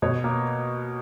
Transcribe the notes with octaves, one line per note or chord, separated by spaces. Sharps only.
B2 C#5
A#3